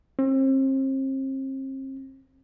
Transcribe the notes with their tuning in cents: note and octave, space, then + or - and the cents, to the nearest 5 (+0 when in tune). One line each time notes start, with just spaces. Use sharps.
C4 +35